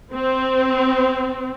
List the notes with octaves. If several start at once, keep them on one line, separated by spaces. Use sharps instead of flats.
C4